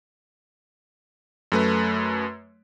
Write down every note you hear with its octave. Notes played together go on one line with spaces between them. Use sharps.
F#2 A3 B4